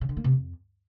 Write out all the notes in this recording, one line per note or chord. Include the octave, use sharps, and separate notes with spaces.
C#3
D3
A#3
C3
F2